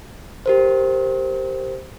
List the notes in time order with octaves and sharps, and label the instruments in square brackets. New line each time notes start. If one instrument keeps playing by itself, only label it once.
[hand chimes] G4 A#4 C5